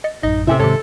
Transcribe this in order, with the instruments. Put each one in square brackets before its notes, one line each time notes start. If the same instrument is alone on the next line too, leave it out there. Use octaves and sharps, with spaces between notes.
[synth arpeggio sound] D#5 A6 C#7
[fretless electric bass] A1 F#2 [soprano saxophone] D#4 [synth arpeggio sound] D#5
[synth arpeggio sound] A2 C#4 A4 [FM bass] C3 [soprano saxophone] E5
[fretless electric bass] G#2 D#3 [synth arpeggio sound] G4 C#5 [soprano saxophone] A4